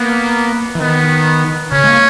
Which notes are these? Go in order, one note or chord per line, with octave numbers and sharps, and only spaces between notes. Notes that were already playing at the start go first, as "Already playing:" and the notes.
Already playing: A#3 B3
E3
D#3 B3
C#3 C#4
G#3
A#3